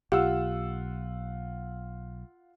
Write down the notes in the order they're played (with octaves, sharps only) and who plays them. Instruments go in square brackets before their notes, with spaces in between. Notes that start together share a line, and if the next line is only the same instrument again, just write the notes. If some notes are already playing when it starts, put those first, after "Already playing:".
[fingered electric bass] B1 [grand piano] F4 F#5 E6 [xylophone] G4